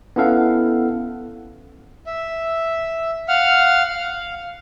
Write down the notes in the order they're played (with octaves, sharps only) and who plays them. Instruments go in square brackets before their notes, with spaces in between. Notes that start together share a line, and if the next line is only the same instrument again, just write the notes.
[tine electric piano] B3 C#4 E4 A4 F5 F#5
[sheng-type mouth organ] E5
F5 F#5 F6
F5